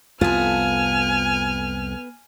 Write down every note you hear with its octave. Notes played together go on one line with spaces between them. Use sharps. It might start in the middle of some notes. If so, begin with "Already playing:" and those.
C2 F2 B3 F4 A4 G#5 F6